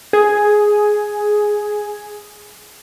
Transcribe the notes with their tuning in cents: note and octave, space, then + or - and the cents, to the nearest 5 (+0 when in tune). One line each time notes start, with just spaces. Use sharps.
G#4 +5